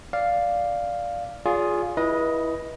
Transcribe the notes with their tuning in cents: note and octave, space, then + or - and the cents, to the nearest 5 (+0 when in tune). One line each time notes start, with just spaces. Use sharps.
D5 +0 F5 +0
F4 +10 G#4 +0 D5 -35
E4 -5 B4 -30 D#5 +10